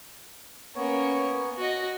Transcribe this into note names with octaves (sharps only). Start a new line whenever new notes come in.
A#3 B3 C#4 C#5
F#4 D#5